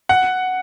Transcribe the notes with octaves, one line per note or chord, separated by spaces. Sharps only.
F#5